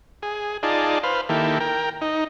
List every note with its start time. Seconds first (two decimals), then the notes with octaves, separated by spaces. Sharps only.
0.22 G#4
0.63 D#4 F4 G#4 D5 A5
1.03 B4 C5 F5
1.29 D#3 A#3 E4 G4 A4
1.60 A#4 G5
2.01 D#4